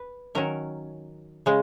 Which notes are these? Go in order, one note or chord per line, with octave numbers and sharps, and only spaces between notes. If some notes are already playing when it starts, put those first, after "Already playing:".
Already playing: B4
D#3 F#3 C#4 A#4
C#3 G#3